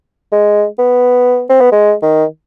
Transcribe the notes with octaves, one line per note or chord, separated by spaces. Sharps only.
G#3
B3
C4
B3
G#3
D#3